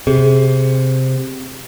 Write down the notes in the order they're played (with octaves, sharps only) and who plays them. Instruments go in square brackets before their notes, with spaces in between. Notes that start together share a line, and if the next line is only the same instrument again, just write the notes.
[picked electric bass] C3 [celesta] G#4